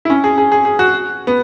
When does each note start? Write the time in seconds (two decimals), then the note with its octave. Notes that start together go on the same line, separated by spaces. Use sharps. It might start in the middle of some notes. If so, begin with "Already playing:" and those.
0.05 E4
0.10 C#4
0.24 G#4
0.38 G#4
0.52 G#4
0.65 G#4
0.79 F#4
1.27 B3